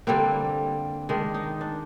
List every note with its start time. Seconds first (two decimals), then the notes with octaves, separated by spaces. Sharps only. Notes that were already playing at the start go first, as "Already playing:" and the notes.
0.07 D3 G3 A#3 C4
1.09 D#3 G#3 D4
1.34 D#4
1.61 D4